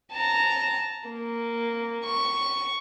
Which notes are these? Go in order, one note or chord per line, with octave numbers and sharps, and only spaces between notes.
A5 A#5
A#3
C#6